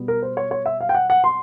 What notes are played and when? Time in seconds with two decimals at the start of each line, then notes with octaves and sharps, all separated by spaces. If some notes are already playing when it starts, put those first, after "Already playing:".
Already playing: B2 G3 B3
0.08 A#4
0.22 C5
0.37 C#5
0.51 C#5
0.66 E5
0.81 F5
0.89 G5
0.95 F#5
1.10 F#5
1.24 C6